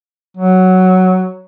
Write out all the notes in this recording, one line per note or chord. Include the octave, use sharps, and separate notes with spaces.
F#3